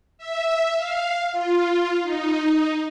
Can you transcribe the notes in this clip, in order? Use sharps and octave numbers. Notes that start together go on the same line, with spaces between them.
E5
F5
F4
D#4